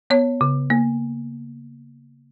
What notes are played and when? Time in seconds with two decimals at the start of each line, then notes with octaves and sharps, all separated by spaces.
0.10 B3 C#5
0.41 C#3
0.70 A#3